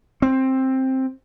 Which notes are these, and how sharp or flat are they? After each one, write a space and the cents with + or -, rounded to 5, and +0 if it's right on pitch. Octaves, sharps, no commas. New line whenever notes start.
C4 +10